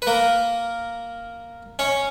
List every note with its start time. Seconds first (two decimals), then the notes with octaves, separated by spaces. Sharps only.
0.02 B4
0.07 A#3 A#4
1.79 C#4 C#5